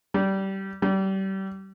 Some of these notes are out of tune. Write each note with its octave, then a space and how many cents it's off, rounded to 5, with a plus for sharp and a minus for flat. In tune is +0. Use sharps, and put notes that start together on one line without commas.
G3 -20
G3 -30